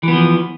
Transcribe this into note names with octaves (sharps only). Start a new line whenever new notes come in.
E3 F3 B3